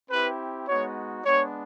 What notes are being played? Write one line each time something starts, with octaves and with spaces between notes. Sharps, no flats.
C4 E4 G4 B4
G#3 B3 D#4 F#4 C#5
G#3 B3 D4 C#5